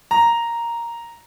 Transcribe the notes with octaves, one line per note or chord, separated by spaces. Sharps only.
A#5